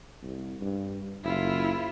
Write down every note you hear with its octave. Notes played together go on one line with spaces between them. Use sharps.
C2
G2
F#1 E4 F4